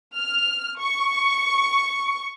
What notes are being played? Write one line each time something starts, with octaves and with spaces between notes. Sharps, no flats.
F6
C#6